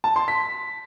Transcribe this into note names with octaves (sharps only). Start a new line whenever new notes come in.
A5
C6
B6